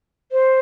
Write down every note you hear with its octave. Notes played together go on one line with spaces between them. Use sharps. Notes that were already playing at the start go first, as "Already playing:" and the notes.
C5